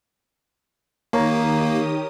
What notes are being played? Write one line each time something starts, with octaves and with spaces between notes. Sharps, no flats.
D#3 A#3 G4 A#4 C#5 D#6